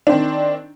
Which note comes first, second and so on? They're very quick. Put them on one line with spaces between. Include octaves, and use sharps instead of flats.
D4 C4 D#3